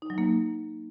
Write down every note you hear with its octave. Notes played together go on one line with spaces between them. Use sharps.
D#4
F#3
A#3